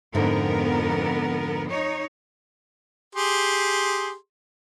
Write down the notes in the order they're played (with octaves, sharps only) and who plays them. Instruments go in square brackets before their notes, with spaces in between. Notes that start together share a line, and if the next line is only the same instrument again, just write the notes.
[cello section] F2 B3 A#4 [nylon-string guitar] G#2 D3 D#4
[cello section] D#4 C#5
[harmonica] G4 G#4 C6